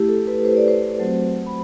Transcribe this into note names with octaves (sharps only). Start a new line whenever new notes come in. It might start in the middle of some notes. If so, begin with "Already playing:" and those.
Already playing: A3 E4 G4
A4
B4
C5
D5
C5
F#3 A3 C4 F#4
B5